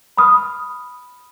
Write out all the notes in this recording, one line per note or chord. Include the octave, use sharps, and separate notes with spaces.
B5 D#6 F6